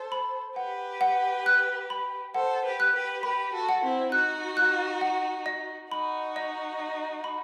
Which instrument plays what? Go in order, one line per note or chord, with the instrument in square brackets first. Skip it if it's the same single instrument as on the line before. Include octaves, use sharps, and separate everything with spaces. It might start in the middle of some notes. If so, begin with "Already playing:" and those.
Already playing: [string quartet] A4 C5
[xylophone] B5
[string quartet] G4 B4 [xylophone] F#5
[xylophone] F#5
F#6
B5
[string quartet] A4 C5 [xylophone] F#5
[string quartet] G4 B4
[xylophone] F#6
[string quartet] G4 B4
[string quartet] G4 B4 [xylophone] B5
[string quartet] F#4 A4
[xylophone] F#5
[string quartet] C4 E4
[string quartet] D#4 F#4 [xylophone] F#6
[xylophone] F#6
F#5
D#5
[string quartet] D#4 F#4 [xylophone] B5
[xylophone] D#5
D#5
B5